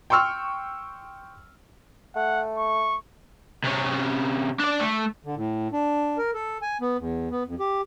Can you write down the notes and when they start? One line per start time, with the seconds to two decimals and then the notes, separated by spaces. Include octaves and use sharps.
0.10 G5 C6 C#6 E6 F6
2.16 A3 F#5
2.58 C#6
3.64 C3 C#4
4.59 D4 D5
4.80 A3
5.25 D3
5.36 A2
5.73 D4
6.18 A#4
6.34 A4
6.62 G#5
6.81 B3
6.98 E2
7.31 B3
7.46 F2
7.60 G4